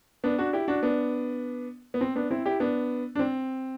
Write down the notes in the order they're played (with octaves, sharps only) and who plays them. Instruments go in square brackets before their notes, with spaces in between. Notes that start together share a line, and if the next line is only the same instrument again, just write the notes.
[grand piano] B3 D4
D4 F#4
E4 G4
D4 F#4
B3 D4
B3
C4
B3 D4
C4 E4
E4 G4
B3 D4
D4
C4